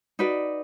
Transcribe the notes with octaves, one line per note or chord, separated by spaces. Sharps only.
D#4 F#4 B4 D5